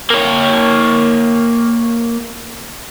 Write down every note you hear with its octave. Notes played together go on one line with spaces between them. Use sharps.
A#3 C#5